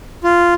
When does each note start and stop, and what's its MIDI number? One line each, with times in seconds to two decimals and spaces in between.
0.24 0.54 65